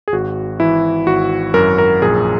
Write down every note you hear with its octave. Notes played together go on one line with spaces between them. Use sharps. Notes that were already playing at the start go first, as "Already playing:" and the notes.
G#4
G#1 F#4
E3 E4
G#1 F#4
F#2 A#4
A#4
A#1 G#4